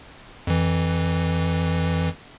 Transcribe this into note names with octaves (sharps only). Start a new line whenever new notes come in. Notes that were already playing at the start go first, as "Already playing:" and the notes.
F2 E3